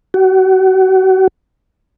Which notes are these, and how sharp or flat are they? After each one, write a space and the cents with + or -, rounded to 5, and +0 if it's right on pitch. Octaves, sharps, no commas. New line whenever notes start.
F#4 +35